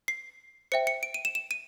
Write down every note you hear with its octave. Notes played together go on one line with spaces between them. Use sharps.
C7
C5 E5 G5 C#7
C#7
D7
D#7
E7
E7
D#7